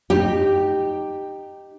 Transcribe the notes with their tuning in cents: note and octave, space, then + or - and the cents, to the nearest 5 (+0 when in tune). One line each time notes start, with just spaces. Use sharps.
D#4 -15 G4 +0 G5 +10